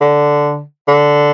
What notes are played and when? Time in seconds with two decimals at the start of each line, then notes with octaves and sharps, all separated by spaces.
0.01 D3
0.88 D3